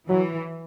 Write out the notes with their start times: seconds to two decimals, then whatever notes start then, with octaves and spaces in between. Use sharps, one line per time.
0.09 E3 F#3